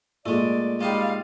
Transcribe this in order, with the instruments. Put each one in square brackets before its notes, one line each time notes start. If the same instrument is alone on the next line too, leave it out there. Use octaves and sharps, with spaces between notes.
[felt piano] A#2 [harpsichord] G#3 A3 [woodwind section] D5
[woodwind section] G3 D5 [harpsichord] G#3 D#4 G4 [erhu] F5